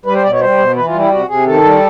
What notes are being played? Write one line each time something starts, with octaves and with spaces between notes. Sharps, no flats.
G3 B4
C5
B2 D5
C#5
G3 C5
B2
E3 B4
F4
G3
E4
G4
C3 F#4
C3 G#4
D#3 A4
G3